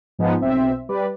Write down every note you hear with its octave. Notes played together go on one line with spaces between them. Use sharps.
G#2 F3 G#3 B3 D#4
B1 C4 E5
G3 B4 D5